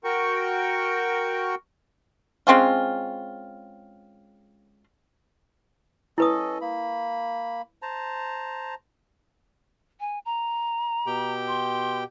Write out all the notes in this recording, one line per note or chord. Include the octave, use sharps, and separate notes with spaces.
F#4 A#4 G5 C#6
G#3 C4 C#4 F4
C#4 E4 A4 B4 D#5 D#6
A#3 B5
C5 A5 A#5
G#5
A#5
B2 G4 G5
C6